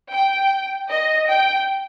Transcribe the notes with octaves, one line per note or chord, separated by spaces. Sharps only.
G5
D#5
G5